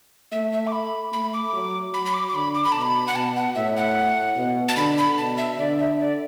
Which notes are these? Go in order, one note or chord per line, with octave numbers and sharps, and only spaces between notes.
A3 E5
E5
D6
B5
A3 B5
D6
F#3
F#3 B5
B5
D6
D6
D3 B5
D6
B5
B2 A5
B5
F#5
B2 A5
F#5
A2 E5
F#5
B2
A5
D3 B5
B5
B2 A5
E5
D3 D5
E5
D5